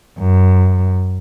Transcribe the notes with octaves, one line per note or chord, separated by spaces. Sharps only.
F#2